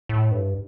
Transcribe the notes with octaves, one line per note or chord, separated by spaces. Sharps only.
A2
G2